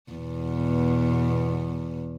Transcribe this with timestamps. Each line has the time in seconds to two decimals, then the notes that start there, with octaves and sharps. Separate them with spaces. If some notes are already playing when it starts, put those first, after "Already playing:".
0.12 E2 B2